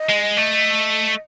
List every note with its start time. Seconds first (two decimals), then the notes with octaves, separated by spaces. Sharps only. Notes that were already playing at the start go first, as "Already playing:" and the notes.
Already playing: D#5
0.10 G#3
0.37 A3